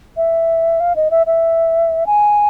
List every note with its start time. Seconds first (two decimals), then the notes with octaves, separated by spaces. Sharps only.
0.17 E5
0.80 F5
0.96 D#5
1.11 E5
1.26 E5
2.06 G#5